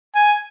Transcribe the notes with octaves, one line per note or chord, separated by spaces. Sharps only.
G#5